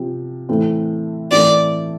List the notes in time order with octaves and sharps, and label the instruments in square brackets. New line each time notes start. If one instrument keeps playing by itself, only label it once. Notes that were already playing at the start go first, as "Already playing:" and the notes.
Already playing: [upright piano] C3 F3 C4
A2 E3 A3 C4
[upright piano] A2 E3 A3 C4 [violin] D5